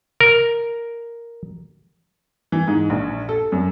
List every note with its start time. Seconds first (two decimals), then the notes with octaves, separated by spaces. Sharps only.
0.21 A#4
2.52 E3
2.68 G#2
2.90 A#1
3.29 A4
3.52 F#2